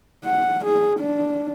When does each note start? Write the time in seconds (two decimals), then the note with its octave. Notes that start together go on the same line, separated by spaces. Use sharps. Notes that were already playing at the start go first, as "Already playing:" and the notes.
0.25 F#5
0.65 G#4
1.00 D4